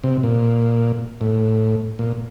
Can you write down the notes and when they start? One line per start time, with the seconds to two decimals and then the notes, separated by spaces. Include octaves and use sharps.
0.04 C3
0.23 A#2
1.21 A2
1.99 A#2